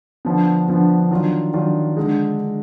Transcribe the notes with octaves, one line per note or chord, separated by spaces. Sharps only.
D3 F3 B3
D3 F3 B3
D#3 F#3 D4 F4
D#3 F#3 D4 F4
D3 G#3